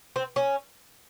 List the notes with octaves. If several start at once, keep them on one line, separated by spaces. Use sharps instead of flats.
C4
C#4